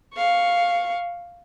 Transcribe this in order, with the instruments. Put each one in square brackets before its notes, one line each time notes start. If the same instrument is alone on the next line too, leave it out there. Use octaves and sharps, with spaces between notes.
[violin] F5 C#6